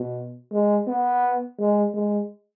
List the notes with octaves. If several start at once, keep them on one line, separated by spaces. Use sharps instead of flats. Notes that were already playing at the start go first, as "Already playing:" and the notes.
Already playing: B2
G#3
B3
G#3
G#3